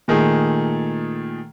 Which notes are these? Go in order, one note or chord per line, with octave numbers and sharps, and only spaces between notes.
A#2 D#3 A3 G#4